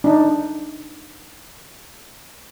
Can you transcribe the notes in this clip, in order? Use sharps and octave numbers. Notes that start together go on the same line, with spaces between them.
D4 D#4